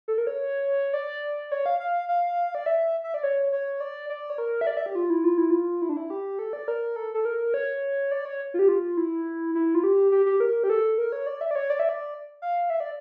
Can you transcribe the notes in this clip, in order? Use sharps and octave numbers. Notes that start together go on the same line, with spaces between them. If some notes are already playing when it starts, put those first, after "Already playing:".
A4
A#4
C#5
D5
C#5
F5
F5
F5
D5
E5
E5
D5
C#5
C#5
D5
D5
C#5
A#4
E5
D5
E5
G4
F4
E4
F4
E4
F4
E4
D4
E4
G4
A4
D5
A#4
A4
A4
A#4
C#5
D5
C#5
F4
G4
F4
E4
E4
F4
G4
G4
G4
A#4
G4
A4
A#4
C#5
D5
E5
D5
C#5
D5
E5
D5
F5
E5
D5